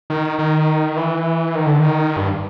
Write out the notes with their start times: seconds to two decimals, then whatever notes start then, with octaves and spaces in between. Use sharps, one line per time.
0.10 D#3
0.39 D#3
0.97 E3
1.55 D#3
1.66 D3
1.79 D#3
2.16 G2